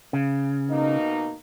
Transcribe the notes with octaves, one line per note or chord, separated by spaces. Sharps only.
C#3
B2 A#3 D#4